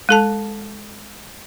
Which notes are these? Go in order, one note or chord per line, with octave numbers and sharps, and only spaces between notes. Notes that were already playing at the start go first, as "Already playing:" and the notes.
G#3 A4 A5